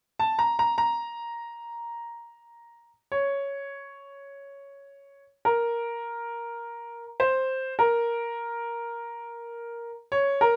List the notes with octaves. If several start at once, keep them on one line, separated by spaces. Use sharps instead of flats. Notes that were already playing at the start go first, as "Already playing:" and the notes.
A5
A#5
A#5
A#5
C#5
A#4
C5
A#4
C#5
A#4